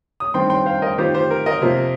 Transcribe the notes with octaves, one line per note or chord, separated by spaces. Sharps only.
D#6
G2 D#3 C4 G5 C6
G5 C6
C5 F5
A#4 D#5
D#3 C4 F4 G4 C5
G4 C5
A#4
A#4 D#5
C3 F3 A#3